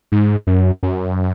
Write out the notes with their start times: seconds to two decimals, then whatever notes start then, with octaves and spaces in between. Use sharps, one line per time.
0.12 G#2
0.47 F#2
0.83 F#2